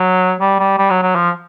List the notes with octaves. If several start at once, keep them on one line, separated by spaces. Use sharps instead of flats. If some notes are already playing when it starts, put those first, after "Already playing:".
Already playing: F#3
G3
G3
G3
F#3
F#3
F3